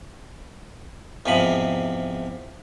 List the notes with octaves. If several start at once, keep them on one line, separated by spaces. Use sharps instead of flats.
E2 G#2 C3 F3 B5